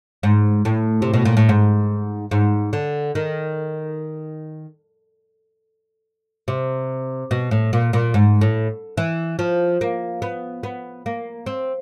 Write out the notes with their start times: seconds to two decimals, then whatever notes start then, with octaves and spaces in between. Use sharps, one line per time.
0.23 G#2
0.65 A2
1.02 C3
1.14 B2
1.25 A#2
1.37 A2
1.49 G#2
2.31 G#2
2.73 D3
3.15 D#3
6.48 C3
7.31 B2
7.51 A2
7.73 A#2
7.93 A#2
8.14 G#2
8.41 A2
8.97 E3
9.39 F3
9.81 A#3
10.22 B3
10.63 B3
11.06 A#3
11.46 C4